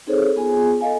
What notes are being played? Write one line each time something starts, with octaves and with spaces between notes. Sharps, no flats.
C4 D#4 G#4 A4 C5 C#5
B3 F4 G#4 G#5
A4 D#5 F5 G#5